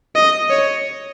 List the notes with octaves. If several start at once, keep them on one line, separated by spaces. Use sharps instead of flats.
D#5
C#5